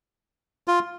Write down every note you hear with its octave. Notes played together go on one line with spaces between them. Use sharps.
F4